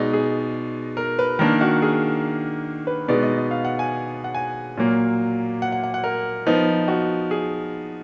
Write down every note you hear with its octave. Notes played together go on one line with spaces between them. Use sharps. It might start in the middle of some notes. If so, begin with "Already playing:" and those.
Already playing: B2 G#3 D#4 D5
G#4
A#4
B4
D#3 A#3 D4 A#4
F#4
G#4
B4
B2 G#3 B3 D#4 D5
D#5
D#5
F5
F#5
G#5
F#5
G#5
A#2 F#3 A#3
F#5
F#5
F#5
F#5
A#4
F3 B3 D#4
F#4
G#4